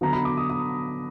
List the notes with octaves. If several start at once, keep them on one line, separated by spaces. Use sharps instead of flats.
D3 F#3 B3 A#5
B5
D6
D#6
D#6